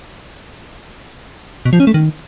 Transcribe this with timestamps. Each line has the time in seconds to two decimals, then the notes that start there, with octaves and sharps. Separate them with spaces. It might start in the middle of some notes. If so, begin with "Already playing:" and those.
1.65 B2
1.73 F3
1.80 C#4
1.87 A3
1.94 D#3